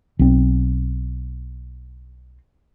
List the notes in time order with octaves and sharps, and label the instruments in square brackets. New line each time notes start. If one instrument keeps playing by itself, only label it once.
[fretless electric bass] B1 C4